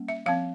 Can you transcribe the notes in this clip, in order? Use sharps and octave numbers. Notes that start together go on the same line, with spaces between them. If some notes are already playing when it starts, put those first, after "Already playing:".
Already playing: G3 A#3 C#4
E5
F3 C4 F5